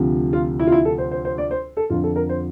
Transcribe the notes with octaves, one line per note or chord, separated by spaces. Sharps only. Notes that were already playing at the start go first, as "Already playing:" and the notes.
Already playing: D2 C3 F3
F4
E4
F4
E4
A4
C5
C5
C5
D5
C5
A4
F2 D3 F3 F4
A4
A#4
C5